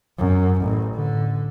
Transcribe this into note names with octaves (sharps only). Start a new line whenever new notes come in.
F#2
A1
D3